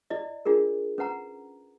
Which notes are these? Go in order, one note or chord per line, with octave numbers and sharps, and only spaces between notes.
E4 D5 D#5
D4 F4 G#4 A#4
C#4 B4 F#5 A#5